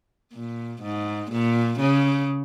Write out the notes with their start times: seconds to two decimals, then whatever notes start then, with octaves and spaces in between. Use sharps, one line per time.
0.33 A#2
0.82 G#2
1.31 A#2
1.80 C#3